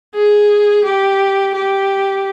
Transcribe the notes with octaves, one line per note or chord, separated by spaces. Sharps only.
G#4
G4
G4